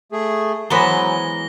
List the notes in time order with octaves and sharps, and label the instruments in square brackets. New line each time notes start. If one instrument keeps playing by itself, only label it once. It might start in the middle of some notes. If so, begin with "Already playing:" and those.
[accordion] A3 G#4
[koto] E3 G#3 B3 [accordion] F#3 [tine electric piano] C5 A#5 [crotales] A#6 G7